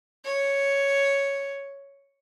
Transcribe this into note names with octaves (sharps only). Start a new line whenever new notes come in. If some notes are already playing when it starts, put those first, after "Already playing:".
C#5